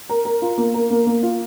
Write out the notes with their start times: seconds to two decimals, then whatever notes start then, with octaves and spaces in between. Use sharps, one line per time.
0.09 A#4
0.25 A#4
0.42 F4
0.58 A#3
0.74 A#4
0.90 A#3
1.07 A#3
1.23 F4